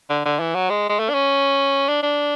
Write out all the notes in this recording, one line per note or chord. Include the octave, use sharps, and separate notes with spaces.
D3
D3
E3
F#3
G#3
G#3
A3
D4
C#4
D4
D4